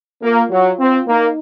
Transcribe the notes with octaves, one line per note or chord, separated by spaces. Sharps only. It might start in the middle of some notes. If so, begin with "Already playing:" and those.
A#3 F4
F#3
C4
A#3 D#4